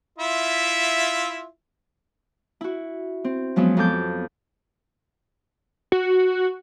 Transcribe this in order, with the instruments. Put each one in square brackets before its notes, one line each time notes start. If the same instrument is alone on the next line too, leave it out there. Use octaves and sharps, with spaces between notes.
[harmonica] E4 F4 E5
[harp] E4 F#4
C4
F3 F#3 G#3 B3 C#4
F2 B3 A4 D6 G6
[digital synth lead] F#4